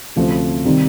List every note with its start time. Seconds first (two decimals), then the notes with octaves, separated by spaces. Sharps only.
0.16 D2 C3 F3 A3 C#4
0.65 C3 D#3 G3 C4 D#4